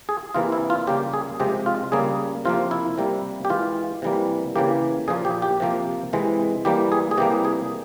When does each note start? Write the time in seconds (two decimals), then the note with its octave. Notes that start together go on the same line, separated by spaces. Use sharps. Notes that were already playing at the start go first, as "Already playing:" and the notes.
0.09 G#4
0.34 C3 E3 A#3 F4
0.52 E4
0.70 F4
0.87 C#3 G3 A#3 G4
1.14 G#4
1.40 C3 F3 G#3 G4
1.66 F4
1.92 C#3 G3 A#3 G#4
2.45 C3 F3 A#3 F4
2.71 E4
2.98 C3 G3 A#3
3.45 G4
3.50 E3 G#3 F4
4.02 C3 E3 G3 A#3
4.56 C#3 E3 A#3 G4
5.08 A#2 F3 A#3 G#4
5.25 G4
5.42 G4
5.60 C3 F3 A#3
6.13 C3 E3 G#3
6.65 E3 G3 A#3 G4
6.92 G#4
7.11 G#4
7.18 C3 E3 G3 A#3 G4
7.45 G#4